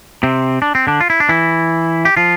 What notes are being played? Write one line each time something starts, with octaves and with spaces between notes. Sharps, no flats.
C3 C4
D4
C4
D3 D4
F4
E4
D4
E3 E4
G4
F3 F4